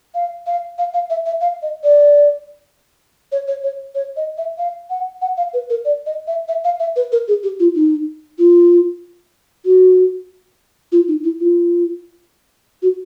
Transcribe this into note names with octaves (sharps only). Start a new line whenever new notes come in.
F5
F5
F5
F5
E5
E5
F5
D#5
D5
C#5
C#5
C#5
C#5
D#5
E5
F5
F#5
F#5
F5
B4
A#4
D5
D#5
E5
E5
F5
E5
B4
A#4
G#4
G4
F4
D#4
F4
F#4
F4
D#4
E4
F4
F#4